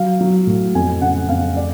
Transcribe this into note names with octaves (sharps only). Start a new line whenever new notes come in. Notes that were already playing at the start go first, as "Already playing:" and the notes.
Already playing: F#3 F5
F#3
A2
F2 G#5
C#3 F#5
F2 F5
D5